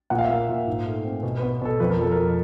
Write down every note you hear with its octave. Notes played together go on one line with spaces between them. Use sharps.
A#2 F#5
F5
E5
A#3 F5
A#2
G#2
A3
C4
B2
B4
B3
B2 A4
F2 B4
A#4
F3 A4
A#4
F2